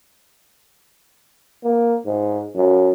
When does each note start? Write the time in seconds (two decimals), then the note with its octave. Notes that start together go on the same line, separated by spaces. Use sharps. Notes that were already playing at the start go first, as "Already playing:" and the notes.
1.64 A#3
2.05 G#2
2.55 F#2